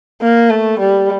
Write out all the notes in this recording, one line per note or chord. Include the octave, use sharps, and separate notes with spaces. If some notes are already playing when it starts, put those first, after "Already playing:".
A#3
A3
G3